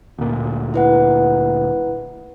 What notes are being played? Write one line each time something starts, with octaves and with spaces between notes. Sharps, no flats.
D2 A#2
E4 B4 F#5